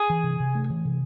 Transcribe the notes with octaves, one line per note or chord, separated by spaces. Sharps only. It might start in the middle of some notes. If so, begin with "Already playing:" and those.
Already playing: G#4
E3
C3
C3
A3
E3
C3